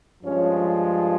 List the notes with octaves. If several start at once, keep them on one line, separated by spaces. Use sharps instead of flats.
G2 F3 G#3 C#4